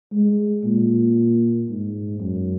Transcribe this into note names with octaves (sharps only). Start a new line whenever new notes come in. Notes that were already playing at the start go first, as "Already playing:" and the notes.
G#3
A#2
G#2
F#2